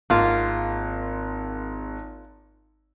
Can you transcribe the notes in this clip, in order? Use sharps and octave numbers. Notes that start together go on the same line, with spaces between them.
G#1 A#3 F4